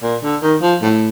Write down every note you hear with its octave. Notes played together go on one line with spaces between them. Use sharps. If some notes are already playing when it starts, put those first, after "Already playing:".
A#2
D3
D#3
F3
A2